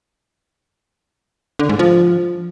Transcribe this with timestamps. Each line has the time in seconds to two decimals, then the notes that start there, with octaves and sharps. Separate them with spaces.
1.59 D3
1.69 G#2
1.79 F3